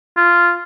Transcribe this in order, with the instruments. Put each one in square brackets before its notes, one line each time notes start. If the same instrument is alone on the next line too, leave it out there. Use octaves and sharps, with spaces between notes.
[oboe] F4